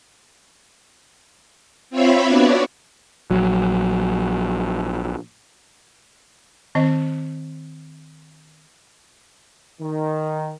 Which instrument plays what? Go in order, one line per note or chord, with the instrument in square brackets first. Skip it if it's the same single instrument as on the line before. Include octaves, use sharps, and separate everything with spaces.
[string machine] C4 F4 C#5 E5 F5 B5
B3 D4 F#4 C#5 D5
[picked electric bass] A#1 F#3
[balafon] D#3 C4 D#5
[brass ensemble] D#3